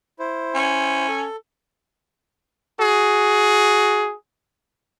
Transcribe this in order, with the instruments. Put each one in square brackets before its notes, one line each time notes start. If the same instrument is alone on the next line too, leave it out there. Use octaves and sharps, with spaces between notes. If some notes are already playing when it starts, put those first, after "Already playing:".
[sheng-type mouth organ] E4 C5
[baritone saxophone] C#4
[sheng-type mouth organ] A4
[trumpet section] F#4 G#4